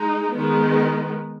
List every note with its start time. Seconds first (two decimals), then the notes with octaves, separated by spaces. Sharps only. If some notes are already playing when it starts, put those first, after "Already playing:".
Already playing: G#3 D#4
0.34 D#3 G#3 B3